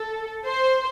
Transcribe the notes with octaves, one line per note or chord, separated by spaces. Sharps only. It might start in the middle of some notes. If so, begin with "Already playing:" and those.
Already playing: A4
C5